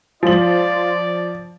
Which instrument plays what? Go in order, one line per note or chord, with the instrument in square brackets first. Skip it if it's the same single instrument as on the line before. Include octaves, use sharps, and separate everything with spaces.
[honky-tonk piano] F3 F#7 [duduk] F4 [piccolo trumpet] D5